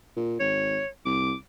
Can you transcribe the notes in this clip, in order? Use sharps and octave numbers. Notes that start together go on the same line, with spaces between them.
A#2
G#1 C#5
C2 D6